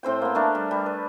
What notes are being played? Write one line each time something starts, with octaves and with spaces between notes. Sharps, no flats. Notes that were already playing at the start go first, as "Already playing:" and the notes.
A2 C4 C5 G5
A#3 B3
A3 D4 A#4
G3
G3
B4